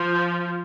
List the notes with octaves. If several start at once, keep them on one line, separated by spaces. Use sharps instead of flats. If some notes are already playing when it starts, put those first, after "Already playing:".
Already playing: F3